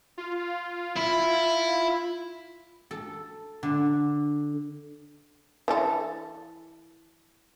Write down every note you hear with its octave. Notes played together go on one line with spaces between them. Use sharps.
F4
E4
A4
D3
E3 D4 A4